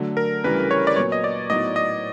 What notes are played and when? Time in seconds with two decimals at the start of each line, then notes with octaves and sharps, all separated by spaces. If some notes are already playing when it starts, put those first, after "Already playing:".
Already playing: D3 F#3 A3
0.17 A#4
0.44 D2 C#3 E3 G3 B4
0.71 C#5
0.87 D5
0.96 A#2 F#3 B3 C#5
1.12 D#5
1.24 D5
1.50 A2 F#3 B3 D#4 D#5
1.76 D#5